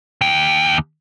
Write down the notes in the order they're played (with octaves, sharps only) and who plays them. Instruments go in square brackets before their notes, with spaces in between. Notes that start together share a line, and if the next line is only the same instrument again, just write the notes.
[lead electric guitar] D#2 G5